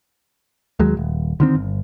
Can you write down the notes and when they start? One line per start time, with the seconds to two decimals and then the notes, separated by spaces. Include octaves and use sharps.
0.80 D#2 F#3 G#3
0.97 D#1
1.40 D3 D#3 C4
1.55 G1